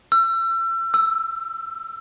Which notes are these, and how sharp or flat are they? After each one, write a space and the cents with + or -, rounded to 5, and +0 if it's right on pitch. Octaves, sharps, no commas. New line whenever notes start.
E6 +35
E6 +5